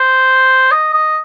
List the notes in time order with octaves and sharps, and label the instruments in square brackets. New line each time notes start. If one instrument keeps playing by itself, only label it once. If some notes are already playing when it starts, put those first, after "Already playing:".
Already playing: [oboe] C5
D#5
D#5